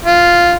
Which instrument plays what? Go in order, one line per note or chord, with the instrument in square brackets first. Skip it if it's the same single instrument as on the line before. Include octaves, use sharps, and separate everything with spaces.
[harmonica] F4